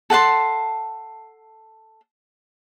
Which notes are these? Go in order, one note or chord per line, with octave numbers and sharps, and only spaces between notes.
A4 F#5 A5 C6